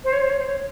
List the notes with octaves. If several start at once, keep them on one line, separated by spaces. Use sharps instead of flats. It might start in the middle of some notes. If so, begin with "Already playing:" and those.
C5
C#5
C5
C#5
C5
C#5